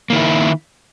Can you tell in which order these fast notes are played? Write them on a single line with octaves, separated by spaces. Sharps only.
A#3 D#3 E4